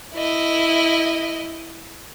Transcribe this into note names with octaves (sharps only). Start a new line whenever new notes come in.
E4 D#5